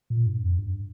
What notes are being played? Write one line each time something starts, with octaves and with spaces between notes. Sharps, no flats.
A#2
G2
F2
G2